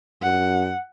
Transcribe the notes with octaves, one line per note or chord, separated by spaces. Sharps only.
F#2 F#5